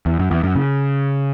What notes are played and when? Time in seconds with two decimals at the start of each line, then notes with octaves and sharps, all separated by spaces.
0.06 E2
0.19 F#2
0.31 E2
0.43 F#2
0.56 C#3